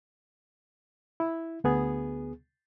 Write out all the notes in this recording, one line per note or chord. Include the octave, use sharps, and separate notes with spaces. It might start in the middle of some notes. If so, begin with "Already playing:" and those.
E4
D2 B3 G#4